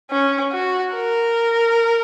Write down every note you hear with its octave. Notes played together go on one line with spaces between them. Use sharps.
C#4
F#4
A#4